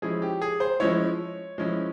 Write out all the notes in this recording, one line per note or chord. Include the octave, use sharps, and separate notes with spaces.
F3 G#3 C#4 E4 G#4
G4
G#4
C5
F3 G#3 C#4 E4 C#5
F3 G#3 C#4 E4